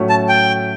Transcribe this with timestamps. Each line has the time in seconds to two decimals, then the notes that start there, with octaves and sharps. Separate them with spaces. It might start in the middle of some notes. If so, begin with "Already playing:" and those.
Already playing: A2 F#3 A3 C#4
0.09 A5
0.29 G5